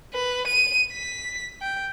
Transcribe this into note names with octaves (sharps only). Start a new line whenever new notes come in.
B4
D#7
B6
G5